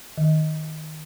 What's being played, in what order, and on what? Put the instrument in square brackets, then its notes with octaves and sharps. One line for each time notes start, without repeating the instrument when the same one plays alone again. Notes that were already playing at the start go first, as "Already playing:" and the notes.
[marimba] D#3